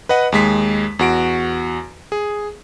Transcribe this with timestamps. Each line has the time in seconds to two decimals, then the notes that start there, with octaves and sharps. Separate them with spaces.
0.09 B4 D#5 F#5
0.32 D#2 G#3 B6
0.99 E2 F#4 D7
2.12 G#4